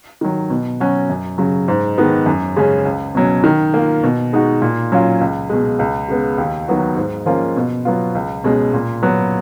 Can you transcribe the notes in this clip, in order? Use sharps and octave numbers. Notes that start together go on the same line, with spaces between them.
D#3 F#3
B2
F#3 C#4 F#4
F#2
C#3 F#3
G#2
D#3 G#3 B3
F#2
C#3 G#3 C#4
C#2
B2 F#3 C#4
D#3
A#3 F4
B2
G#3 D#4 F#4
A#2
F#3 C#4 F4
C#2
B2 G#3
C#2
C#3 G#3 B3
D#2
D#3 F#3 B3 F#4
G#2
F3 A#3 C#4 F4
B2
F#3 B3 F4
C#2
B2 G#3 C#4
A#2
F#3 B3 F#4